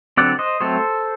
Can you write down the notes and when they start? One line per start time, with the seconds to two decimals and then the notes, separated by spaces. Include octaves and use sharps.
0.17 D3 F#3 C4 D5 F#5
0.39 C5 D#5
0.60 F#3 A3 C4 A4 C5